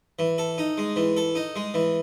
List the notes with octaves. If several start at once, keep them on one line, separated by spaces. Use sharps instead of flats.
E3
A4
D#4
G#3
E3
A4
D#4
G#3
E3